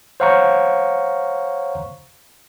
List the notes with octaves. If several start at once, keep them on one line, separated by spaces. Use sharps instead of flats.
C5 C#5 F5 F#5 A#5 C#6